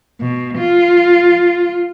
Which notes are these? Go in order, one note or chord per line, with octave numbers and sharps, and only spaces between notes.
B2
F4